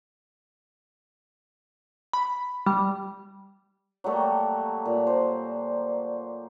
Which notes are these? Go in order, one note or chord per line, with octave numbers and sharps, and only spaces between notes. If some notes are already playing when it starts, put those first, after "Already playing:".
B5
G3
F#3 G3 A3 A#3
A#2
C5